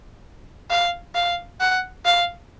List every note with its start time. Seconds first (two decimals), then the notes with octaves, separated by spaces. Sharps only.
0.70 F5
1.15 F5
1.61 F#5
2.05 F5